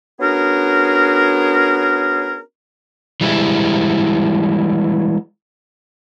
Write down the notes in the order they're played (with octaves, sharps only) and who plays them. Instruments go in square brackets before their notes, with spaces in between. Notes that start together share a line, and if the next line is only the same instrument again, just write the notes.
[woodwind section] B3 C#4 D4 F#4 G#4 A#4
[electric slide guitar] E3 G3 G#3 E4